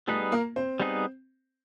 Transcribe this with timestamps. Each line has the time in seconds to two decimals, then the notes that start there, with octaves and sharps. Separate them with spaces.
0.07 G3 A3 B3 D#4 G#4 A4 B4
0.32 A#3 A#4
0.56 C4 C5
0.80 G3 B3 D#4 G#4 B4